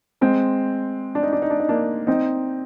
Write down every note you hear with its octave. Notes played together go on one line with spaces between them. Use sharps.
G#3 C4
D4
D#4
D4
D#4
D4
D#4
A#3 D4
C4 D#4